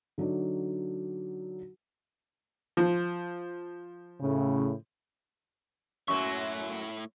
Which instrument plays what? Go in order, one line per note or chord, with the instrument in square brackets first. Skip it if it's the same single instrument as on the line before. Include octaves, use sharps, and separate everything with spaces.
[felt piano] D3 F#3 D4 D#4
[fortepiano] F3
[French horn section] A2 C#3
[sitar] F#2 F#3 A#3 [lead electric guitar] A2 E5 [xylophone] C#6